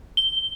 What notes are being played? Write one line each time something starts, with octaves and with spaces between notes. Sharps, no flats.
G7